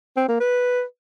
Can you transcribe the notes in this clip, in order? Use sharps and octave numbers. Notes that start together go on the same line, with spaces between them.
C4
A#3
B4